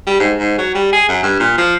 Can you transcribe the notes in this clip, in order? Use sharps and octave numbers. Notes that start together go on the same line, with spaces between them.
G3
G#2
G#2
F#3
G3
G#4
F#2
G2
A#2
F3